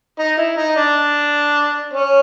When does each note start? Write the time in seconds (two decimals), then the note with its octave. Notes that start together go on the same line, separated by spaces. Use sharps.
0.19 D#4
0.38 E4
0.57 D#4
0.76 D4
1.93 C#4